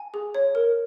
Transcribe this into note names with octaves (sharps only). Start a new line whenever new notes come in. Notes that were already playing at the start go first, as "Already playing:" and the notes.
Already playing: G#5
G#4
C#5
A#4